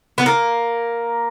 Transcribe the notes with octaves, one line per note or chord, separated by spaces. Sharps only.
B3
A#3